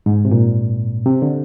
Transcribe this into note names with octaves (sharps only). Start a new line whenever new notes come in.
G#2
C3
A#2
C3
D3